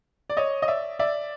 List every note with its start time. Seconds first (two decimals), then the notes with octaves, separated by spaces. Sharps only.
0.30 D5
0.37 C#5 D#5
0.62 D#5
0.68 D5 E5
0.99 D5 E5